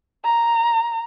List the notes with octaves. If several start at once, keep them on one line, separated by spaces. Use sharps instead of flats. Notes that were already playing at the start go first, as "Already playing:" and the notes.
A#5